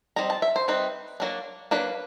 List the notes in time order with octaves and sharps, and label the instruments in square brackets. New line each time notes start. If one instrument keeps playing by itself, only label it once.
[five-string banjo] G3 C4 D#4 A#5
A5
E5
C5
G3 C4 D#4 B4
F#3 A#3 D4
F#3 A#3 D4 B4